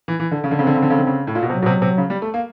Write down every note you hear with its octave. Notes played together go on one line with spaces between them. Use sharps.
E3
E3
D3
C#3
D3
C#3 C4
D3
C#3
D3
C#3
D3
C#3
A2
A#2
B2
C3 F#3
B2
C3
C3
C#3
G3
A3
A#3